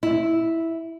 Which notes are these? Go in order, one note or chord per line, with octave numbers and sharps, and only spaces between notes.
E4